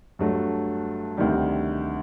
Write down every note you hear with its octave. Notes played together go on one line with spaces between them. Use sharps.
G2 F#3 A3
D2 C3 D#3 G3